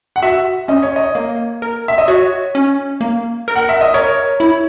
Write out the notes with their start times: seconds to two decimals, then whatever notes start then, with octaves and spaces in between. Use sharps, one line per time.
0.16 F#5
0.23 F#4 E5
0.68 C#4 D#5
0.83 C#5
0.96 D#5
1.15 A#3
1.62 A#4
1.88 E5
1.98 D#5
2.08 F#4 C#5
2.55 C#4
3.01 A#3
3.48 A#4
3.55 F#5
3.69 E5
3.81 D#5
3.94 A#4 C#5
4.40 E4